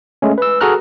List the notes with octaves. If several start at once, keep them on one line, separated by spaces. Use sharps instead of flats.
G#3 A3 C#4
B4 E6
F#4 G#4 A4 A#5 F6 F#6